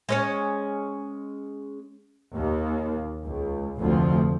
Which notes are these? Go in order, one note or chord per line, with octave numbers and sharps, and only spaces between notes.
G#3 C#4 C#5
D#2
C#2
F1 D2 F3